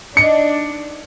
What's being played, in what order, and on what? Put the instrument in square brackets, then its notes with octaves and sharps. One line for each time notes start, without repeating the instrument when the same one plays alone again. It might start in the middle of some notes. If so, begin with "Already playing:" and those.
[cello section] D4 [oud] D#4 D#5 [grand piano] C#7